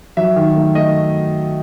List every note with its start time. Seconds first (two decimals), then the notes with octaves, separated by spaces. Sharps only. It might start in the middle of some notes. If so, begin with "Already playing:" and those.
0.17 F#3 E5
0.36 D#3
0.56 A3
0.75 A3 D#5